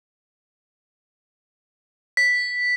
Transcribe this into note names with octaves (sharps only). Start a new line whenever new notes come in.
B6